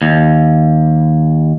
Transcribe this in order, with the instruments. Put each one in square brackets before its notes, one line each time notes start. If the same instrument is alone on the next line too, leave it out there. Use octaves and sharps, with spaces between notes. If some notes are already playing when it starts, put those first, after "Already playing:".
[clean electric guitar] D#2